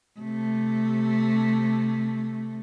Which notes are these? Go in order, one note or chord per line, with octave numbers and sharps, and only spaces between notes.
C3 A3